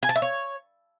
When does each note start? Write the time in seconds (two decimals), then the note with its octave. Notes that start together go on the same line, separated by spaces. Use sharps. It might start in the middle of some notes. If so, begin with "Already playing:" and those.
0.03 G#5
0.09 A5
0.16 E5
0.22 C#5